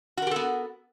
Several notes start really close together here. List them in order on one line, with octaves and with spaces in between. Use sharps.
F#4 A#4 G4 A4 B3